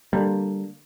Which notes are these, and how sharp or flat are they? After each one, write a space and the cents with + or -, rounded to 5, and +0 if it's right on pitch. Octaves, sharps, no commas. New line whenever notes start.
D3 +10 G3 +0 A#3 +0